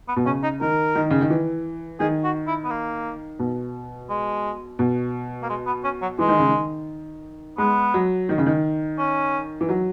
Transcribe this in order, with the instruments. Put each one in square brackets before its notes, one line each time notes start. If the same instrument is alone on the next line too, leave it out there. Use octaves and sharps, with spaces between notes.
[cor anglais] B3
[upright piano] B2
[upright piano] C#3 [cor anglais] C#4
[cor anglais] D#4
[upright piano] D#3 [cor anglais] A#4
[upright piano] D#3
C#3
D#3
E3
[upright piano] D#3 [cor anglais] G#4
[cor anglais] F#4
E4
B3
A#3
[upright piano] B2
[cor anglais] G#3
[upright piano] B2
[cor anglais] A#3
G#3
B3
C#4
F#3
[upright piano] E3 [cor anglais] G#3
[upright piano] D#3
C#3
D#3
[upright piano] G#3 [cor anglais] B3
[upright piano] F#3
D#3
C#3
D#3
[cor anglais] C#4
[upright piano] E3
F#3